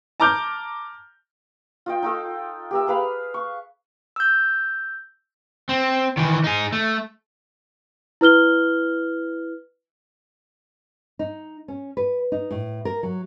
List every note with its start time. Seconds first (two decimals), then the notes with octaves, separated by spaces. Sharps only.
0.20 A5 A#5 D6 F6 G6
1.86 F4 D#5 G5
2.02 D#4 F4 A4
2.71 G4 A#4 E5
2.87 G#4 B4 F5 B5
3.34 C#6
4.16 E6 G6
5.69 C4
6.17 D#3 E3
6.44 D#4 G#4
6.72 A3
8.21 E4 B4 F6 G7
11.19 D#4
11.68 C#4
11.97 B4
12.32 D#4
12.51 A2
12.85 A#4
13.03 F#3